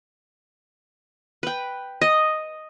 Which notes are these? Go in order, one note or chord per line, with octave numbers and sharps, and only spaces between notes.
B4 G5
D#5